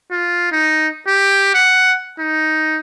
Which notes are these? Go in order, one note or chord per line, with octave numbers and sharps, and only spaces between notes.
F4
D#4
G4
F#5
D#4